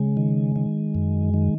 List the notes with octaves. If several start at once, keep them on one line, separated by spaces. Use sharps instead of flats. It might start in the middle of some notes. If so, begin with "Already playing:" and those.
Already playing: C#3 G#3
D#3
D#3
F#2
D#3